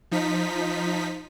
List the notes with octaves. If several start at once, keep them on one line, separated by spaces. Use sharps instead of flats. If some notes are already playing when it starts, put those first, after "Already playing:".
F3 D#4 B6